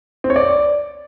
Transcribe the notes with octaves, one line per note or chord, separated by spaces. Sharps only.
C4
C#5
D5